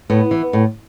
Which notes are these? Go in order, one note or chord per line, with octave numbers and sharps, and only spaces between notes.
A2 B3
E3
A2